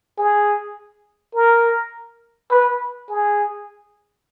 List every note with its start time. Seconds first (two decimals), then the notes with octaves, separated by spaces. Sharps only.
0.18 G#4
1.35 A#4
2.51 B4
3.09 G#4